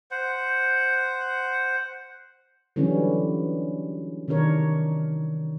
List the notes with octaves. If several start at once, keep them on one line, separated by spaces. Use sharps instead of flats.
C5 F#5
D3 E3 F#3 G3 C#4
C3 D#3 D4 A#4 C#5